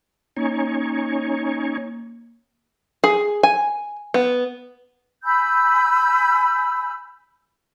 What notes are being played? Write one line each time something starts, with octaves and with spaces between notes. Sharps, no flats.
A#3 C#4 D#4 C#5
G#4
G#5
B3
G#5 B5 E6 G6